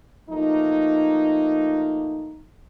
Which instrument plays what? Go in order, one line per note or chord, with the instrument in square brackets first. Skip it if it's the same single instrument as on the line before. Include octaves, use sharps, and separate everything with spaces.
[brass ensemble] F3 A3 A#3 D#4